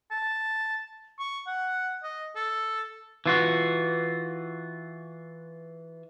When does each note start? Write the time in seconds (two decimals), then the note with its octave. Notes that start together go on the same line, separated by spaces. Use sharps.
0.11 A5
1.19 C#6
1.47 F#5
2.03 D#5
2.36 A4
3.26 E3 F4 F#4